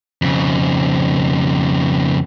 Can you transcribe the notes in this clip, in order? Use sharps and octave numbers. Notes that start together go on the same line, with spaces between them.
F2 C#3